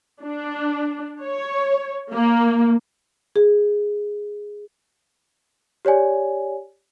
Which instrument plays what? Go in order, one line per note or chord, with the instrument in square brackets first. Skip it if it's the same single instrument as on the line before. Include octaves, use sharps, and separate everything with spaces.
[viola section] D4
C#5
A#3
[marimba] G#4
[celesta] G4 C#5 D5 G#5